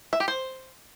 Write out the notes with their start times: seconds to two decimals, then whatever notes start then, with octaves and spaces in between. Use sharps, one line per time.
0.13 E5
0.20 G4
0.28 C5